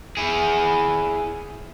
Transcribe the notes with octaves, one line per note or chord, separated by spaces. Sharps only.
E4 G#4